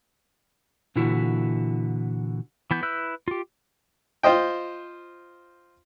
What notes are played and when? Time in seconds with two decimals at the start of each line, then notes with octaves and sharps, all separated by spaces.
0.96 A#2 D3 E3 E4 F#4
2.71 E3 B3 G6
2.83 E4 B4 E6 F#6 G6
3.28 F4 G4
4.23 F4 C5 D#5 G5